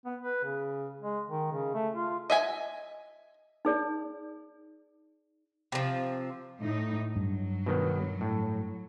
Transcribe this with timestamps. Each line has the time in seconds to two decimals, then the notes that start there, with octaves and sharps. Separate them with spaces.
0.05 B3
0.22 B4
0.44 C#3
1.01 G#3
1.29 D#3
1.53 C#3
1.74 A3
1.95 F4
2.30 D#5 E5 G#5
3.65 D#4 G#4 D5
5.72 C3 F3
6.62 A2 D#4
7.16 G2 F#3
7.66 B2 D#3 B3
8.21 A2